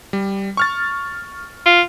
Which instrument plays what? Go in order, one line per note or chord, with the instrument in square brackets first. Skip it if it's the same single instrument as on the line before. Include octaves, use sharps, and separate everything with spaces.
[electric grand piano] G3
C#6 F6 A6
[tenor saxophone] F4